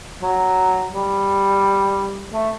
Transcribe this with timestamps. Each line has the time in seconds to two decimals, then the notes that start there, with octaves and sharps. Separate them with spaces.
0.22 F#3
0.93 G3
2.33 A3